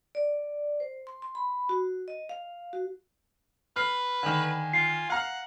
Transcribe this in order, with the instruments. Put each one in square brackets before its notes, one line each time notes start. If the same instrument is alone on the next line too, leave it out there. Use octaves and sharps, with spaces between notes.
[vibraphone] D5
C5
C6
C6
B5
F#4
D#5
F5
F#4
[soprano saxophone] B4 [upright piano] F6 C7
[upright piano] D3 D#3 [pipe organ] G#5
[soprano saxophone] F4 [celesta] C7
[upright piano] F5 A#5 F6 [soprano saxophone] F#5